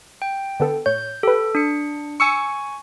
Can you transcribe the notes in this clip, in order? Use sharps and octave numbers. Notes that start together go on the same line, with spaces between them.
G5
D3 B3 A4
A2 C#5 G6
G4 A4 B4
D4 C#7
G#5 C#6 E6 C#7